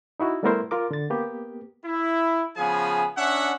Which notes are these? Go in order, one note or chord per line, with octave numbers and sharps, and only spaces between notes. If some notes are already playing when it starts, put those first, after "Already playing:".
D#4 E4 F#4
G3 A3 B3 E4 A#4 C5
F4 A#4 D6
D3 A6
A#3 B3 G4
E4
C#3 F3 B3 G#4 G#5
C#4 D4 E5 F#5